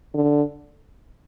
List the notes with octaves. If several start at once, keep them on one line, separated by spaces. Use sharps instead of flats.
D3